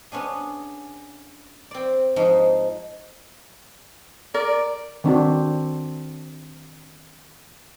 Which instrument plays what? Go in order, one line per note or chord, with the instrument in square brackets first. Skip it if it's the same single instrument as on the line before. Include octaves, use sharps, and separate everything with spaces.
[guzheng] B3 C#4 D4 G#4
C4 D5
G#2 F3 D#4
[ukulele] A#4 [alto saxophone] D5
[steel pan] D#3 C4 D4 F#4